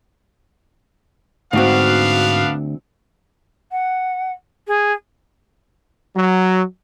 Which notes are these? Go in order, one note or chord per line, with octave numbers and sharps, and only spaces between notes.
D2 G#2 B3 C4 D4 F#4 F5
F#5
G#4
F#3